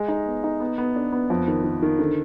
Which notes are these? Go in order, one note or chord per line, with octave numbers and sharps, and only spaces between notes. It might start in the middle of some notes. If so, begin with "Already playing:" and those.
Already playing: G#3
D#4
B3
D#4
B3
B3
D4
B3
F2
D#3
D#3
D#3
D3